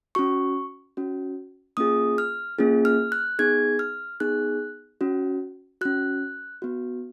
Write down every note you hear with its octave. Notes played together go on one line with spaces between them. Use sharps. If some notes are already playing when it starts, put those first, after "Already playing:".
C#4 F#4 C#6
C#4 F#4
A#3 C#4 F4 G#4 D#6
F6
A#3 C#4 F4 G#4
F6
F#6
B3 D#4 G#4 G#6
F6
B3 D#4 G#4 F#6
C#4 F#4
C#4 F#4 F#6
B3 F#4